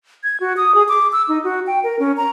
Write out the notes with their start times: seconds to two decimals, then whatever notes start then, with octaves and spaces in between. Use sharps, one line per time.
0.23 G#6
0.40 F#4
0.57 D#6
0.75 G#4
0.89 D6
1.12 E6
1.28 D#4
1.44 F#4
1.67 G5
1.84 A#4
1.99 C#4
2.17 A#5